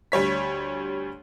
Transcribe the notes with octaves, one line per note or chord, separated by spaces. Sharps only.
D2 G3 C#5 B6